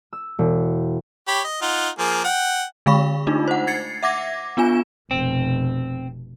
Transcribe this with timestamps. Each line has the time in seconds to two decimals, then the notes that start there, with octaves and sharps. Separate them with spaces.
0.13 E6
0.39 E1
1.28 G4 C#5 B5
1.44 D#5
1.62 D#4 F4 F#5
1.99 F3 A#3 G#4
2.24 F#5 G5
2.86 D3 G#3 F5 B5 C#6
3.27 A3 D4 D#4 F4
3.48 C5 F#5
3.67 G#6 A6 C7 C#7
4.03 E5 F#5 D6 G#6 A#6
4.57 B3 D4 F4 G#5 E7
5.11 F1 B2 C4